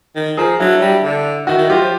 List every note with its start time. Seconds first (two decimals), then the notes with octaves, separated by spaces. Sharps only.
0.16 D#3
0.37 F3 G#4 A#4
0.59 F#3 D4 E4
0.81 G3
1.04 D3
1.47 D#3 E4 F#4
1.58 D#3
1.70 F#3 F4 G4
1.81 F3